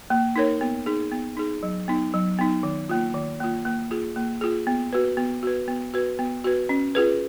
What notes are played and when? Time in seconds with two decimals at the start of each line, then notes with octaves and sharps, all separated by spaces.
0.10 A#3
0.36 D#4 A#4 C#5
0.61 B3
0.86 D#4 G#4
1.12 B3
1.37 D#4 G#4
1.63 F#3
1.88 B3 D#4
2.13 F#3
2.39 B3 D#4
2.63 D#3
2.89 A#3 F4
3.14 D#3
3.40 A#3 F4
3.65 A#3
3.91 F4 G#4
4.16 A#3
4.41 F4 G#4
4.67 B3
4.93 F#4 B4
5.17 B3
5.43 F#4 B4
5.68 B3
5.94 F#4 B4
6.19 B3
6.44 F#4 B4
6.69 C#4
6.95 F4 G#4 B4